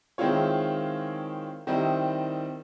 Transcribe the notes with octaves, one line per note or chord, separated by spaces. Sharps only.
D#3 G#3 C4 E4 F4 C#5
D#3 G3 C4 E4 D#5